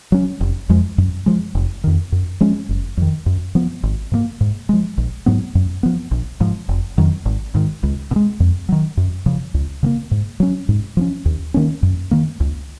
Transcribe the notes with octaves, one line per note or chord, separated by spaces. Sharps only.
F#3 C#4
F1
F2 F3 G#3
F#2
F3 G#3
F1
F2 D#3
F#2
F3 G#3 C#4
F#1
F2 D#3
F#2
F3 B3
G#1
G#2 F3 A#3
G#2
F3 G#3
A#1
G#2 F#3 B3
F#2
F3 B3
A#1
G#2 F3
F1
F2 D#3 F#3
G#1
G#2 D#3
C#2
B2
G#3
F2
D#3 F#3
F#2
C#3 F3
C#2
C#3 F#3 A#3
G#2
F#3 C#4
G#2
F3 A#3 C#4
D#2
D#3 A#3 C#4
F#2
D#3 A#3
C#2